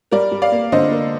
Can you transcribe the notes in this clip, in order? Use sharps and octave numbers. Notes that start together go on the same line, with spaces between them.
G3 A#4 D5
G3
D5 F5
A#3
D3 C5 D#5
A#3